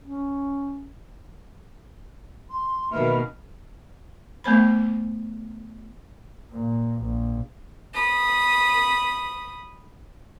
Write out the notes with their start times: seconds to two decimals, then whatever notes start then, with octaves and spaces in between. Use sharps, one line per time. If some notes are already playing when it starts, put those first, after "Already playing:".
0.03 C#4
2.50 C6
2.92 B2 D#3 A#3 B4 E5 B5 F6
4.44 A3 B3 C5 B5
6.51 A#2
7.00 A#1
7.93 B5 D#6